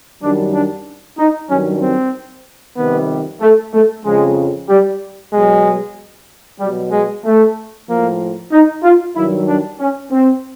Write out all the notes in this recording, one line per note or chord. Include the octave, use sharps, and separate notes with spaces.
F#2 D#3 G3 D4
D4
D#4
G2 D#3 F#3 C#4
C4
F2 C3 D#3 G3 B3
A3
A3
F2 C#3 F3 G#3
G3
B2 F#3 G#3
B2 F#3 G3
G#3
A3
A2 F3 A#3
D#4
F4
G2 D#3 F#3 E4
D4
C#4
C4